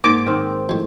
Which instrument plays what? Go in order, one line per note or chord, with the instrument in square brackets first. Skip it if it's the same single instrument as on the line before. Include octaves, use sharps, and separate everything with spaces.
[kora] G#2 [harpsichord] A#3 [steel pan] D6
[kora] D#3 C4
[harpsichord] F2 A2